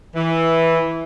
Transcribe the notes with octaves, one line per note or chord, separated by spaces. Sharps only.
E3